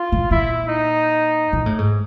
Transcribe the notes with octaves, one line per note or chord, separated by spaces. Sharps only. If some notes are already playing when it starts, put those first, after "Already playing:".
Already playing: F4
A#2
A#2 E4
D#4
A#2
A2
G#2